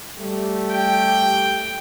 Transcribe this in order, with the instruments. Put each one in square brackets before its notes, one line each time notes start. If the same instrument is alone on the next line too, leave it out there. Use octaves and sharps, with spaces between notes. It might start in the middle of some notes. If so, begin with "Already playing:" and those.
[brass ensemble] G3 A3 G4
[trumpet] G5